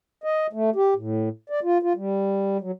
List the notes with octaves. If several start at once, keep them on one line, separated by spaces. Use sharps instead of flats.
D#5
A3
G4
A2
D5
F4
F4
G3
F#3